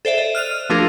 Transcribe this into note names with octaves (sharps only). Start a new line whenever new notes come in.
A4 C5 D5 E5
D#5
F6 F#6 D#7 F7
F6
F3 A3 D4 F4 G#4 A#4